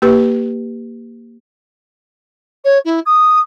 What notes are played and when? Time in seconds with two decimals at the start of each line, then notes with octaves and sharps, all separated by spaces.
0.02 A#3 G4 B4
2.64 C#5
2.84 E4
3.05 D#6